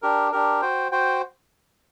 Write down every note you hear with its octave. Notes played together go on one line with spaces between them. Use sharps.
D4 G4 A#4
D4 G4 A#4
F#4 C5 G5
F#4 C5 G5